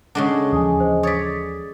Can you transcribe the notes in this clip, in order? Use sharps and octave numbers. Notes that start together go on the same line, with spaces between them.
C#3 G#3 D4 F#5 C#6
D#2 E3 F3 G#5 D#6
C5 D#5 G#5
C#5 D5 D#6 A6 B6